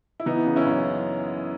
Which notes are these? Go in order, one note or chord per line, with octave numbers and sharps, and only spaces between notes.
E4
E3 B3 D#4
C#3
C#4 E4
F#2